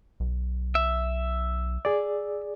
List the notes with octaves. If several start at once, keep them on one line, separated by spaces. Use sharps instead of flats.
B1
E5
G#4 D5